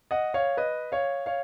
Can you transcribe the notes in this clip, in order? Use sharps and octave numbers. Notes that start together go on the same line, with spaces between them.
D#5 F#5
C#5 F5
B4 D#5
C#5 F5
C#5 F5